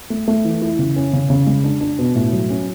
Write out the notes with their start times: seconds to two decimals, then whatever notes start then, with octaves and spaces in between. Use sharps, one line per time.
0.10 A3
0.28 A3
0.45 E3
0.62 E4
0.79 C#3
0.96 C#4
1.13 C#3
1.30 C#3
1.47 G#3
1.64 D4
1.81 D4
1.99 B2
2.15 A2
2.33 F#3
2.50 C#4